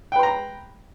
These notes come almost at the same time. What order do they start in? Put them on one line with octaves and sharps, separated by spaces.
G5 B4 C6 A#5